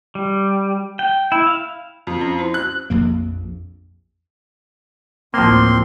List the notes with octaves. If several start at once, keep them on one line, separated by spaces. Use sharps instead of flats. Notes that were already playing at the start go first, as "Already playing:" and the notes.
G3
G5
E4
F5
F2
C#4
E4 C5
F#6
A#1 F2 A#3
A1 D2 A2 F3 A#3 C4 C6